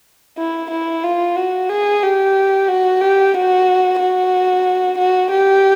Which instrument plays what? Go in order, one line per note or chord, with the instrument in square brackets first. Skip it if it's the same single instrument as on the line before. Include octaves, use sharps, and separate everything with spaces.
[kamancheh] E4
E4
F4
F#4
G#4
G4
F#4
G4
F#4
F#4
F#4
G4